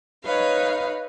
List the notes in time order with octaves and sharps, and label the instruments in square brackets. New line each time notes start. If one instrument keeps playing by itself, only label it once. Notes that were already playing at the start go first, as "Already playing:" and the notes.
[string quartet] D#4 B4 C#5 F5